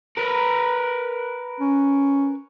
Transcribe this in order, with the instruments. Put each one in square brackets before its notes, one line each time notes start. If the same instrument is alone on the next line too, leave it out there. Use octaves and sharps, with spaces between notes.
[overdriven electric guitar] A#4 B4
[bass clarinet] C#4